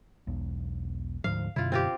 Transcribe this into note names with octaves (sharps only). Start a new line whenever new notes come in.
E1 B1
D2 G#2 F3 F5
F#2 B2 D3 E4 F4
C4 F4 G4